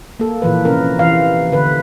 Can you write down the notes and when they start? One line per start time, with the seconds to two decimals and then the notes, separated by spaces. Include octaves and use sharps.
0.20 A#3 A4
0.42 A#2 E3 F3 B4
0.65 C3 C#4 A#4
0.99 E3 F5
1.52 D3 B4